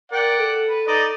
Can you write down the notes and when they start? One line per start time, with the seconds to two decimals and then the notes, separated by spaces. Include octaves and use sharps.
0.12 A#4 D5 F#5 G5
0.39 A4
0.68 B4
0.88 D#4 D5 D#5